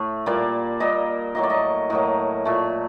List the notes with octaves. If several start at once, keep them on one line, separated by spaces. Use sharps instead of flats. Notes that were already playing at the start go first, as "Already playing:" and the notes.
Already playing: A2 A3
A#2 G3 A#3 D5
A#2 G3 A#3 D#5
A2 F#3 A#3 D#5
D5
D#5
A2 F#3 A#3 D#5
A#2 A3